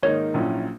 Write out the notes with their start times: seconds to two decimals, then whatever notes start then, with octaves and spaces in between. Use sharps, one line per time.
0.03 G#2 D#3 A#3 D#4 C#5
0.34 A#1 A#2 F#3 C#4 E4